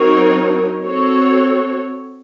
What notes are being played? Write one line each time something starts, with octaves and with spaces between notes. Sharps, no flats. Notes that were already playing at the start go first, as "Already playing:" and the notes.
Already playing: F#3 C4 D#4 A#4 C#5
C4 F#4 A4 C#5